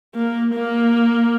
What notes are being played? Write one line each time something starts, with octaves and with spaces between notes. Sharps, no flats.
A#3
A#3